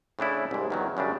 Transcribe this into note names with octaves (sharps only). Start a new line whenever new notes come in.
A2 C#3 D4 E4
C2 G#2
E2 D#3 F#3
F#2 C#3 G3 D4